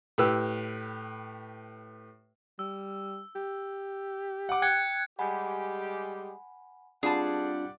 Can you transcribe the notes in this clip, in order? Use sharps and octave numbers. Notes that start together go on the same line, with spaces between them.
A2 G4 B4 E6
G3 E6
G4
F#5 D6
G5 F#6 G#6 C#7
G3 G#3 G4 F#5 G#5 B5
G3 C4 D4 F4 G#4 D5 F#5 A5